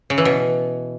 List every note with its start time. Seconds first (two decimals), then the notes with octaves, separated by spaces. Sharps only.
0.10 C#3
0.18 E3
0.25 B2